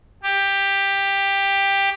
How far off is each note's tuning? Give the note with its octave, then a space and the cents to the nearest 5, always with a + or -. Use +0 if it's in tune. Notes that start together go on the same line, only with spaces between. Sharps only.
G4 +10